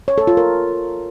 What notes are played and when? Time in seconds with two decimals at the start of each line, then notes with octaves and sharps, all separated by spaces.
0.08 C#5
0.18 A4
0.27 F4
0.37 A#4